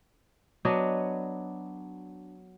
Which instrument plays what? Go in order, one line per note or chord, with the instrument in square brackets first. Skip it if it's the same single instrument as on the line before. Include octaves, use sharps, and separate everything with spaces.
[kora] F#3 B3 D4 D#5